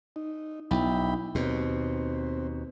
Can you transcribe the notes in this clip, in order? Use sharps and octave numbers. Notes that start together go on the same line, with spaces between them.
D#4
B1 E4 G5 B5
D#2 B2 C4